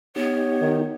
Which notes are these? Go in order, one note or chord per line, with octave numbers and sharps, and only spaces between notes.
B3 D#4 G4 C#5
D#3